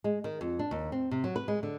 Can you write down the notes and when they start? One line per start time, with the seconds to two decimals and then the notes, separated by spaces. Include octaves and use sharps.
0.04 G#3
0.24 D#3
0.41 F2
0.59 D4
0.71 D#2
0.92 C4
1.11 C3
1.24 F#3
1.36 B4
1.48 G#3
1.63 D3